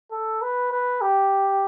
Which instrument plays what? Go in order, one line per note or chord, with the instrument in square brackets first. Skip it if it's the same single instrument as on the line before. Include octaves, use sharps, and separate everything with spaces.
[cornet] A4
B4
B4
G4